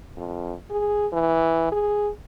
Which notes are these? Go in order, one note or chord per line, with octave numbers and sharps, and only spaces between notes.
F2
G#4
E3
G#4